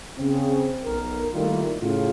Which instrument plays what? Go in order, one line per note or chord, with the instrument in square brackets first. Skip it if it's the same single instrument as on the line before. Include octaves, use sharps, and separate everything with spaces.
[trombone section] C#3 C4
B1 A#4
D#3 G3 A3 A#3 E4 F4
A2 C#3 F4